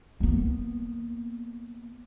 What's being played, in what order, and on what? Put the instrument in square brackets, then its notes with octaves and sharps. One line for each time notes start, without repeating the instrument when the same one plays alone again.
[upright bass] A#3 B3